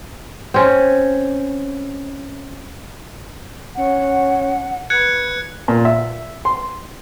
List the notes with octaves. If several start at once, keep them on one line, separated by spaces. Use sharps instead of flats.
C4 C#4
C#4 F#5
B4 F#6 G#6 C#7
A#2
E5
C6